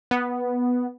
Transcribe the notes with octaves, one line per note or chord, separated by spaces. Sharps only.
B3